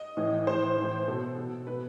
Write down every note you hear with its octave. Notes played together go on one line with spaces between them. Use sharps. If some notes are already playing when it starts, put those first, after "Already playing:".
Already playing: D#5
A2 E3
A2 E3 C5
A2 E3
B2 A4
B2
B2 B4